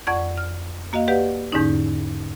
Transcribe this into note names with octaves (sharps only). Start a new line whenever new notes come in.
F2 D5 F#5 C#6 G#6
F6
A#3 F#4 D#5 F5
G4 B4 D5 F5 F#5
E2 G#2 D3 C#4 D#4